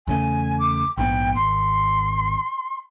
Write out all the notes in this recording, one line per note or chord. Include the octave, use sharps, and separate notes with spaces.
E2 C#3 A3 G#5
D6
A#1 G#2 B3 G5
G#1 C6